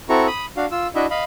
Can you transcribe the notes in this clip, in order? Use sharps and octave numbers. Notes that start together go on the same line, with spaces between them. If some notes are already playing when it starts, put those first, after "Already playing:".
C4 E4 F#4 A4 A#5 C#6
B5 D#6
D4 F#4 F5
F4 E6
D4 E4 F#4 D#5 E5
D#5 F5 B5